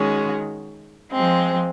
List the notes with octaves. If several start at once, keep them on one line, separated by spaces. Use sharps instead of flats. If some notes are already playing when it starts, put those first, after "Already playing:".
Already playing: D#3 G#3 C#4 F#4
F3 G#3 C4